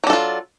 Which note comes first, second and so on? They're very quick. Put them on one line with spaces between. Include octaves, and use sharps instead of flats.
F#3 D4 A4 F4